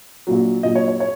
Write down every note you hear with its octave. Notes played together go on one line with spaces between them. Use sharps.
A#1 A#2 F#3
A#1 A#2 F#3 D#5
C#5
C#5
C#5